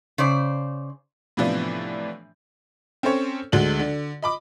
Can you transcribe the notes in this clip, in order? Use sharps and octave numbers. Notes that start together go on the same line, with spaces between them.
C#3 C5 D5
A2 C3 E3 F3 B3 D4
C4 C#4 A4 C5 C#5
D2 D3 G#3 F#7
D3
D#5 B5 D6